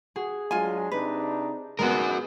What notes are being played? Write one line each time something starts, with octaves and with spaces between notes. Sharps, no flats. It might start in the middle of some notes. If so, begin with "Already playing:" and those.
F#4 G#4
F#3 G#3 D4 F4 G#5
C3 D4 D#4 B4
A#1 B2 D#3 G#3 B3 F#4 A#4